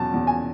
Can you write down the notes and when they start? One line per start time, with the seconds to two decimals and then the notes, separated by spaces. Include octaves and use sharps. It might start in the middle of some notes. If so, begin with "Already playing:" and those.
Already playing: E2 B2 F#3 A5
0.14 E2
0.27 G#5